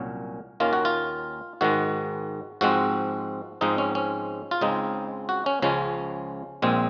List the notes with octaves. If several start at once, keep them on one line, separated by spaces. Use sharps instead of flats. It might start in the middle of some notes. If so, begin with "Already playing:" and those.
Already playing: C2 A#2 F#3 C#4
D#2 D#3 A#3 C#4 F4
F#4
F4
G#2 D#3 G#3 F#4
G#2 F3 G#3 C4 F#4
G#2 F3 G#3 C4 D#4
C#4
C#4
F4
C#2 C#3 G#3 C4 D#4
F#4
C#4
C#2 C#3 F3 G#3 C#4
A#1 A#2 G#3 C4